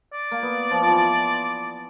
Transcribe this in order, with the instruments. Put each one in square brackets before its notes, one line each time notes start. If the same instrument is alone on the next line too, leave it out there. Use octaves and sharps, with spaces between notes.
[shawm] D5
[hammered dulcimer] A#3
B3
F3
F3
E3